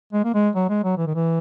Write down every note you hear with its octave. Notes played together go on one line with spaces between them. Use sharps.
G#3
A#3
G#3
F#3
G#3
F#3
E3
D#3
E3